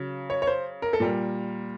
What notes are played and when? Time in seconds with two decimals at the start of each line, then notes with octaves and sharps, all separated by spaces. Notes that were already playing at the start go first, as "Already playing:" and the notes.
Already playing: C#3 F#3
0.30 C#5
0.42 C#5
0.47 C5
0.82 A#4
0.93 A4
1.00 A#2 G3 A#4